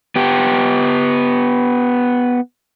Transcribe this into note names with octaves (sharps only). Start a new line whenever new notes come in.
B3 G4